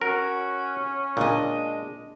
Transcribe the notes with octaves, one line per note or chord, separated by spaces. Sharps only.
C#4 F#4 A#4
A#2 G#3 D4 D#5